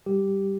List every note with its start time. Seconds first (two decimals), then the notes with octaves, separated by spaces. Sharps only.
0.06 G3 G4